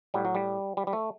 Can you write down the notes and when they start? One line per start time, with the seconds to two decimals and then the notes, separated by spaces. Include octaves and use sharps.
0.14 A2 F#3 G3
0.25 F#3
0.35 G3
0.77 G3
0.87 G3
0.93 A3